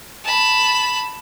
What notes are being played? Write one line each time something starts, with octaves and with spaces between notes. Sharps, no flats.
A5 B5